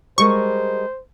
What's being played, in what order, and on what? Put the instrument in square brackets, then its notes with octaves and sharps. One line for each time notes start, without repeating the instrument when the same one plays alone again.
[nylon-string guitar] G3 G#3 A#4 [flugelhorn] C5 [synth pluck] C#6